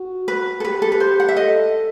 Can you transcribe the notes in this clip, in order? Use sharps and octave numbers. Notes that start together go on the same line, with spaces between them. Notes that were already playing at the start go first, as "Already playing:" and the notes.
Already playing: F#4
B4
A4
G4 B4
A4
B4
C5
F#5
E5
A4 D#5